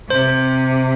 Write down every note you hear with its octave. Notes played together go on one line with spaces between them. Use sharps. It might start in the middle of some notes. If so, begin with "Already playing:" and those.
C3 C5